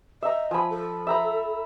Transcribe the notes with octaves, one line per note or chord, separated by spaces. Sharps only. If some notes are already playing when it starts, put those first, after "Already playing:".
D#5 E5 A#5
F3 G#5 B5
A4
E5 A#5 B5